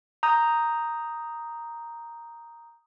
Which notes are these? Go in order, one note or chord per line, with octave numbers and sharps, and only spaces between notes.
A#5 D#6 G6